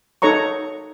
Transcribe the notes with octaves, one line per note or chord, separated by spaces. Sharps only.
D#4 A4 C#5 A#5 C#6